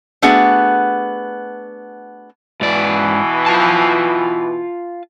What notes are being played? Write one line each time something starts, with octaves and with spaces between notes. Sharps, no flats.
A3 B3 D4 F#4 G#4 F#5
G#2 B2 E3 D5
F4 A5